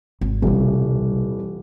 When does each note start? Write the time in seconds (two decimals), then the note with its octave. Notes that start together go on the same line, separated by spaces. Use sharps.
0.21 G#1
0.42 D#1 B1 C3 E3 G3